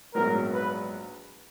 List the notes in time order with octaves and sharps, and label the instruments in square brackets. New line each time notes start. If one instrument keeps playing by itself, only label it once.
[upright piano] A#1 G#2 F#3 B3 [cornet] A#4
[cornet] B4